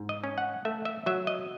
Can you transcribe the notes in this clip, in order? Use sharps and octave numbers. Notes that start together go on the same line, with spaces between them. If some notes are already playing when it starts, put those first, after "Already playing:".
Already playing: G#2
D#5
C#4
F#5
A3 E5
E5
F#3 E5
D#5